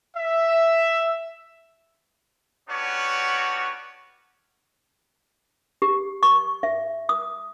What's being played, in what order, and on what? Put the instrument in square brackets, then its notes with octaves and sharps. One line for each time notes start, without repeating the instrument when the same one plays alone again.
[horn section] E5
[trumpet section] B3 C#4 D4 F#4 G4 C#5
[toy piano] G4
C#6
E5
D#6